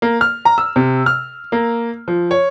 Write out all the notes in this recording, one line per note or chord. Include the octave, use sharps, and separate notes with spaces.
A#3
F6
A#5
E6
C3
F6
A#3
F3
C#5